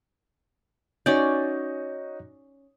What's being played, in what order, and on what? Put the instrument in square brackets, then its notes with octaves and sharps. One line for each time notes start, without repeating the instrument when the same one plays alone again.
[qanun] C#4 D5 [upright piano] D#4 F#4 [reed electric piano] C#5 G6